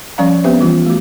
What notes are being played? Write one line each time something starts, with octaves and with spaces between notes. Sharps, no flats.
F3 G3 C#4 D5 F5 A#5
B3 C4 G4 B4 C5 E5
E3 G3 F4
A3 F#4